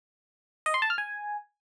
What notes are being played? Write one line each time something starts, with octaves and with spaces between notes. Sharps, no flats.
D#5
C6
A5
F6
G#5